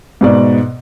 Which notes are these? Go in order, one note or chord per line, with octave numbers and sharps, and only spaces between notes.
G#2 B2 D5